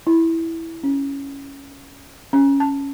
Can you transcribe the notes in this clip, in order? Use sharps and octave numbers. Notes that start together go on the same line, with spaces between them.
E4
C#4
C#4
A5